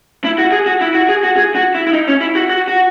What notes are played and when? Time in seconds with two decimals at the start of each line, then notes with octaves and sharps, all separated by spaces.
0.24 E4
0.38 F#4
0.52 G#4
0.66 F#4
0.81 E4
0.94 F#4
1.09 G#4
1.23 F#4
1.36 G#4
1.55 F#4
1.75 E4
1.87 E4
1.93 D#4
2.08 C#4
2.21 E4
2.35 F#4
2.49 F#4
2.68 F#4